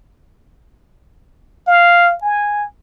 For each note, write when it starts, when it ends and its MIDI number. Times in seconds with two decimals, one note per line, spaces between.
1.68 2.15 77
2.22 2.65 80